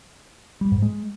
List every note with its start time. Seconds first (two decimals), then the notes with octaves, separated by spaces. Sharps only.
0.61 G3
0.72 G#2
0.82 G#3